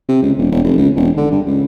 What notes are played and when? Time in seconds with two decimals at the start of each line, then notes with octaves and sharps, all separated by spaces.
0.09 C3
0.22 C#2
0.37 E1
0.51 E1
0.64 F1
0.78 C#2
0.96 E1
1.17 D3
1.31 G2
1.47 C#2